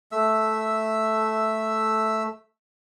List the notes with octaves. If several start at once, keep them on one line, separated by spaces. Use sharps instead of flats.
A3 E5 E6